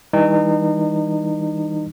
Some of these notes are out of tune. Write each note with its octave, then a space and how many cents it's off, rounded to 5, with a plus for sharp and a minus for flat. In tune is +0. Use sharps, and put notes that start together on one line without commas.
E3 -35 G3 +35 D#4 -35